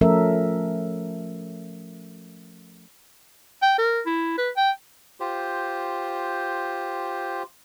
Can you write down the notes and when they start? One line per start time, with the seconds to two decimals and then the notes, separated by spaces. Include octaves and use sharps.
0.01 F3 A3 C#4 A4 A#4 E5
3.62 G5
3.78 A#4
4.06 E4
4.38 B4
4.57 G5
5.20 F4 G4 C5